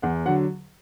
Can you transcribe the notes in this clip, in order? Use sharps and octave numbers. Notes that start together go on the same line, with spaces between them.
E2 F#5
D3 F#3 F#5